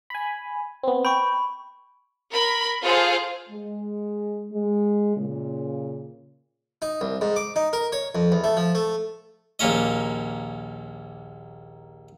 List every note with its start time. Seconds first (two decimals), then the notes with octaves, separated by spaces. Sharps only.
0.10 G#5 B5
0.83 B3 C4
1.05 G5 B5 C#6
2.32 A#4 B5
2.84 F4 G#4 A4 C5 F5
3.50 G#3
4.52 G#3
5.17 A#2 C#3
6.82 D#4
7.01 C2
7.21 G#2
7.36 D6
7.56 D#4
7.73 A#4
7.92 C#5
8.15 F2
8.32 E2
8.44 A3
8.57 F3
8.75 A3
9.59 A#1 D#2 A#3 C#4 D#5